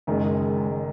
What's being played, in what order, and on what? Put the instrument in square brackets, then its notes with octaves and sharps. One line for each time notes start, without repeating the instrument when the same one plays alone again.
[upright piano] F#1 F#2 D#3 [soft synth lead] G#3